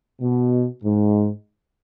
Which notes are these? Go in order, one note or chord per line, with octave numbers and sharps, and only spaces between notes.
B2
G#2